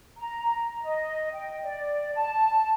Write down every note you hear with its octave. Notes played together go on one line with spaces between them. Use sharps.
A#5
D#5
G5
D5
A5